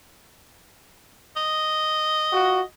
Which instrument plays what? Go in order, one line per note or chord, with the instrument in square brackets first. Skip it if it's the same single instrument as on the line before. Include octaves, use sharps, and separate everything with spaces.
[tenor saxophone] D#5
[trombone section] F4 F#4